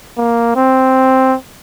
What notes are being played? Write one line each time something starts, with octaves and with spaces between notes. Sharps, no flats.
A#3
C4